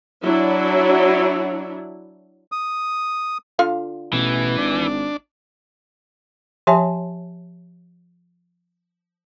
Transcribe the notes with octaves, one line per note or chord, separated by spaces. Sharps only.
F#3 D4 E4
D#6
D3 F4 F5
A1 B2 E3
G#1 D4
F3 G4 C#5 E5 G#5 A5